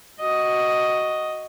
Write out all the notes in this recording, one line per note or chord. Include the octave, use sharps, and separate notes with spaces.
F#4 D#5